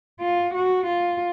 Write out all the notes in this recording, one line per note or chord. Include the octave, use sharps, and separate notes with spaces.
F4
F#4
F4